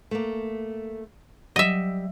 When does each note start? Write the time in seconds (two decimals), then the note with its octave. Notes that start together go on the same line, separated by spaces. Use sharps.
0.11 A3 A#3
1.56 F#3 G3 D#5 E5